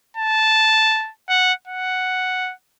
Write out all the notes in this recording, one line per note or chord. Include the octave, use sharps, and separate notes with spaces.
A5
F#5
F#5